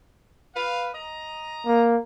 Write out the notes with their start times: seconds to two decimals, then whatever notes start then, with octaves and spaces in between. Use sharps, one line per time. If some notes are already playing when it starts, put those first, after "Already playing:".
0.56 B4 F5
0.94 D#5 A#5
1.66 A#3